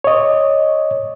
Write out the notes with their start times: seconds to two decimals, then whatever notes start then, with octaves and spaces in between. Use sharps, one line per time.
0.04 C#5 D#5